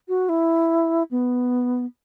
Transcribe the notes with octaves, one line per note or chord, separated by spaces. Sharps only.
F#4
E4
B3